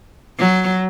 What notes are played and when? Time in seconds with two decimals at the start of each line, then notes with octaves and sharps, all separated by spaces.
0.39 F#3